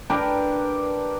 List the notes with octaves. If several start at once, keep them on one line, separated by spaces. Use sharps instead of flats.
D4 G4 A#4 B4